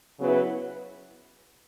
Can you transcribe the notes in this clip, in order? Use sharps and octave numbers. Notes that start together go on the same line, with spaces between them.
C#3 F#3 B3 E4 B4